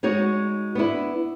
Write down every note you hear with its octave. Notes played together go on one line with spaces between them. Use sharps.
G#3 D#4 F#4 C#5
B3 D4 E4